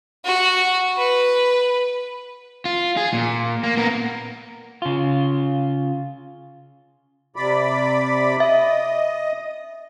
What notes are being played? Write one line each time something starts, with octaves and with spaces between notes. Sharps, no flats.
F#4
B4
F4
G#4
A#2
A#3
B3 A#4
C#3 F4
C3 D5 B5
D#5 E5